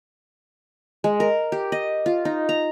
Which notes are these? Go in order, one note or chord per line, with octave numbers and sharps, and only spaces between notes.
G#3
A#4
G4
D#5
F4
D#4
A#5